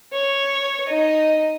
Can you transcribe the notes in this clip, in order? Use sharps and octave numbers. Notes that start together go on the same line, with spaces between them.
C#5
D#4 D#5